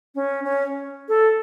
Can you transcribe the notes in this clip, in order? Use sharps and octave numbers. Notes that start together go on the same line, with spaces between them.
C#4
C#4
A4